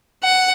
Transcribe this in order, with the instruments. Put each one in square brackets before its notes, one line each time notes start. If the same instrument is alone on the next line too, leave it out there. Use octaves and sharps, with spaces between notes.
[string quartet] F#5